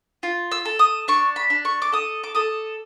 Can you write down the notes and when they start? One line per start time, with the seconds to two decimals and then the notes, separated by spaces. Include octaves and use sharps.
0.23 F4
0.52 E6
0.65 A4
0.79 D#6
1.08 D4 C#6
1.36 B5
1.50 D4
1.65 C#6
1.82 D6
1.92 A4 D#6
2.24 D6
2.35 A4 D#6